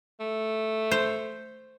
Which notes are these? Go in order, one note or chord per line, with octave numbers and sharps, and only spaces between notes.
A3
C5